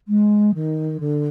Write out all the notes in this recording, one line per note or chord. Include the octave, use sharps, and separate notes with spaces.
G#3
D#3
D3